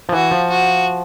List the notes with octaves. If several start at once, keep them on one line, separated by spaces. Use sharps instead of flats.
F3
E3 F#4
F3
F#4